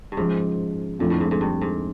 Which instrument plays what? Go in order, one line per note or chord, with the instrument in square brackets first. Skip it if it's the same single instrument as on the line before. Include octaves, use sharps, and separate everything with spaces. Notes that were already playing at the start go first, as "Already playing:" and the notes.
[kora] G2
[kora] G#2 [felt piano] C#3 F3 G#3
[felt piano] F2 D3 F3 A3 [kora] A#2
[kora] A2
G#2
G#2
G2
G#2